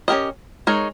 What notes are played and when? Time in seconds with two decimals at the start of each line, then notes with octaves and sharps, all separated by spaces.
0.08 C#4 G4 A#4 D#5
0.67 G#3 D#4 A#4 C#5